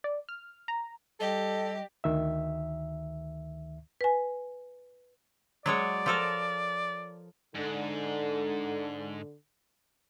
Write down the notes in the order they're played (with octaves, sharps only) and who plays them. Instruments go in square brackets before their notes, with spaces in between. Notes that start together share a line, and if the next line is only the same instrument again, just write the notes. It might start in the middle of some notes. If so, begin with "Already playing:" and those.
[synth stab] D5
F6
A#5
[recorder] G3 [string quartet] G4 [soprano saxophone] A4 [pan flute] D#5
[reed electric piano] D2 D#3 E5
[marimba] B4 G#5
[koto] F#3 G#3 C#5 [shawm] D5
[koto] F3 A4 A#4
[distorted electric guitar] G#2 [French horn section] D3